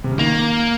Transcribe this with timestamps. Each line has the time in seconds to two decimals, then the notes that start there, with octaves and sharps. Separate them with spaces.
0.04 C3
0.11 C#3
0.19 D#3 A#3